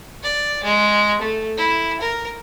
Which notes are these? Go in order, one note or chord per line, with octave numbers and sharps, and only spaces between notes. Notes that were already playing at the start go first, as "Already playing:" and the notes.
D5
G#3
A3
E4
A#4